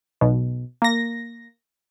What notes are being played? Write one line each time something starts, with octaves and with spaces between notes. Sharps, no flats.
B1 B2
A#3 A#6